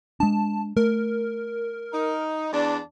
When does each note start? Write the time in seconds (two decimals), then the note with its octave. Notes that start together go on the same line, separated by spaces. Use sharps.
0.20 G#3 D4 A5
0.77 A3 A#4
1.93 D#4
2.53 E2 D4